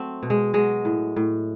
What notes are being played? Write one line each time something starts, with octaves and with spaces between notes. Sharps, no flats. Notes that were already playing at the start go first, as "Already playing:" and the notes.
Already playing: F#3 A3 C4
B2
G#3
F#3 G#3
A2
A2